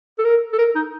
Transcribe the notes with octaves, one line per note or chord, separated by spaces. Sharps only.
A4
A#4
A4
A#4
D#4